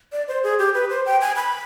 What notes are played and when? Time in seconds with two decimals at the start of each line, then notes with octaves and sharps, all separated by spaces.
0.12 D5
0.28 C5
0.43 G#4
0.59 G4
0.74 B4
0.90 C5
1.06 G5
1.21 G#5
1.36 B5